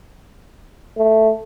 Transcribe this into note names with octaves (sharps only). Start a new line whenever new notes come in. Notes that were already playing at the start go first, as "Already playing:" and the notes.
A3